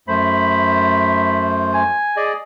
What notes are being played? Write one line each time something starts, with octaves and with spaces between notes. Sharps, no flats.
F#2 A3 C5 B5
G#5
G#4 D5 D#5